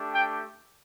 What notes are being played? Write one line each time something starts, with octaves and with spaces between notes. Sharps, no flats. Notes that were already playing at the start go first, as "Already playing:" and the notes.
Already playing: A3 D4 G4
G5